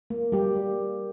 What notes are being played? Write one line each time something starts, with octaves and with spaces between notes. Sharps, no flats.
A#3
G3 A#3 G4
A#3